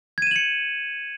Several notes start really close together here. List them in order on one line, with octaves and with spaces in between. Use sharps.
G#6 D#7 E7 F#7 C#7